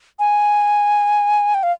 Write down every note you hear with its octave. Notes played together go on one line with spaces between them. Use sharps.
G#5
G5
F5